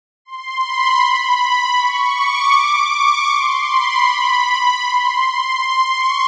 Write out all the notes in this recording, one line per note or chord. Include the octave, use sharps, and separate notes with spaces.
C6
B5
B5
B5
C#6
D6
C#6
C6
B5
C6
C6
C#6